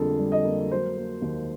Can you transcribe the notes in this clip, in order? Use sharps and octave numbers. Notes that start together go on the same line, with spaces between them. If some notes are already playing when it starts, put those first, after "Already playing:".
Already playing: F2 D3 G3 A#3 G#4 A4
G3
D#5
A#3
F#3 C5
A#3
D#2